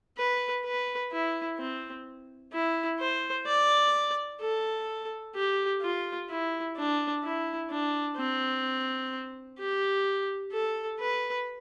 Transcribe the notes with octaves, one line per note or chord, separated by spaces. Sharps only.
B4
B4
E4
C4
E4
C5
D5
A4
G4
F4
E4
D4
E4
D4
C4
G4
A4
B4